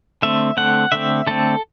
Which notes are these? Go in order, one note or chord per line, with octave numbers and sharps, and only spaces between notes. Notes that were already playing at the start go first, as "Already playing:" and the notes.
D3 A3 C4 E5
D3 A3 C4 F#5
D3 A3 C4 E5
D3 A3 C4 A4